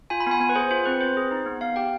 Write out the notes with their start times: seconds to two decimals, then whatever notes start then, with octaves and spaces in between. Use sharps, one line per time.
0.10 F4 G#5
0.20 B5
0.27 B3 G#5
0.40 B3 G#5
0.49 B4
0.55 G#4 C5
0.71 F4 C5
0.86 C4 B4
1.01 C4 C5
1.17 G#4
1.31 D#4
1.46 B3
1.61 B3 F5
1.76 G4 G5